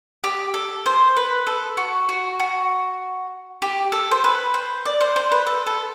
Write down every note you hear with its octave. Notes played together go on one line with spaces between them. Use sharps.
G4
A4
C5
B4
A4
F#4
F#4
F#4
G4
A4
C5
B4
C5
D5
C5
C5
B4
A4
A4